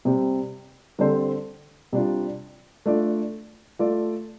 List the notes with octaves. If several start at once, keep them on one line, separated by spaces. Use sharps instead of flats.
C3 G3 C4 G4
D3 G3 C4 A4 C5
C3 G3 D4 F4
A3 D4 F4 D5
A3 F4 A4 D5